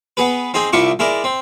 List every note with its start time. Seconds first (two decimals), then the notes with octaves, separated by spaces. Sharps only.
0.17 B3 G#4 B4
0.54 C4 D#4 G#4 G#5
0.73 C2 E4 F4 C#6 D6
0.99 G#3 E4 A#4 D5
1.24 C4